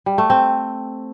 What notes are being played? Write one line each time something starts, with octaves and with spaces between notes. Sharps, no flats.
G3
A3
C4